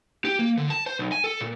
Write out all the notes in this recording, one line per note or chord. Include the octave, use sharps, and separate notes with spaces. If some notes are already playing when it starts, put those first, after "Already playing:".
G4
A#3
D3
A5
C5
B1
G#5
A4
A#2